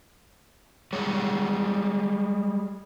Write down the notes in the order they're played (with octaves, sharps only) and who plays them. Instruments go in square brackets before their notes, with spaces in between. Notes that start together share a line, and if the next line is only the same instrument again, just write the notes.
[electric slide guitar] G3 G#3 C#5